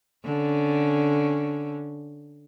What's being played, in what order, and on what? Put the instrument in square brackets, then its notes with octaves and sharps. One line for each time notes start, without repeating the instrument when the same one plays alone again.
[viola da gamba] D3 C#4